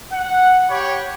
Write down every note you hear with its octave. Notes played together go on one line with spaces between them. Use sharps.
F#5
G4 C#5 F#5 G5 B5